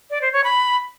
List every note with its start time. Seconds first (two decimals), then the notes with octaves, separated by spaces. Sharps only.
0.10 D5
0.22 C5
0.33 C#5
0.44 B5